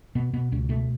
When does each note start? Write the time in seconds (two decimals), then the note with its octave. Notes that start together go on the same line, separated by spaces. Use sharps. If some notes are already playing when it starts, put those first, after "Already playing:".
0.15 B2 B3
0.33 B2 B3
0.52 C#2 C#4
0.69 B2 A3